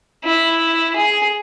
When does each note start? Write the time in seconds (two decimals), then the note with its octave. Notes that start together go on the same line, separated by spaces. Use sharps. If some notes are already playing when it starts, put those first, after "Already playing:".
0.25 E4
0.96 G#4